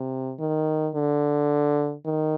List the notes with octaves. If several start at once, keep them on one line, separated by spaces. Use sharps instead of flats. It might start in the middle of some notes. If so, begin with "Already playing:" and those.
Already playing: C3
D#3
D3
D#3